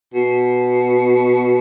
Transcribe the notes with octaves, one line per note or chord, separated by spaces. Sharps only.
B2